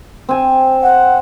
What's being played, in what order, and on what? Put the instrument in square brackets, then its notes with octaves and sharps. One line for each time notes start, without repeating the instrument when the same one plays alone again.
[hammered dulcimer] C4 G#5
[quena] F#5